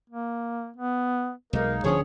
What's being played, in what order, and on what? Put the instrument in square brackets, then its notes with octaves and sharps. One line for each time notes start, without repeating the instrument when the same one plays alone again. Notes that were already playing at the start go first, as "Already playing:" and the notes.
[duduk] A#3
B3
[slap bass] B1 G#3 [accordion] A#3 D#4 [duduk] A#4
[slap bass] D1 D3 C#4 [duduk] F3 [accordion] G#4 C#5